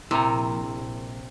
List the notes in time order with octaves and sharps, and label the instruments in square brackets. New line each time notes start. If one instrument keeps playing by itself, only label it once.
[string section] A#1 [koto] C3 [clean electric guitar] E4 A#4 A#5